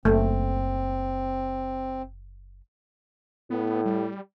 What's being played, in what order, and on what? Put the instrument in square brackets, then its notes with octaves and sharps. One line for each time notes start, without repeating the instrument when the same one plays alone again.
[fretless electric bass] F#1 [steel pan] A3 [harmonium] C4
[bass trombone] A2 [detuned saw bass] B3
[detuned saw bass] G3